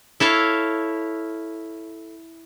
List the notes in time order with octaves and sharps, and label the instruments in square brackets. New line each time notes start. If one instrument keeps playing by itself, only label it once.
[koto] E4 A4 C#5 F5